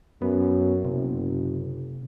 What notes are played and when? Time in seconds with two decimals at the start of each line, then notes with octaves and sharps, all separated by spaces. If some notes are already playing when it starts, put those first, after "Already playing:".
0.22 F#2 B3
0.85 F#1 C3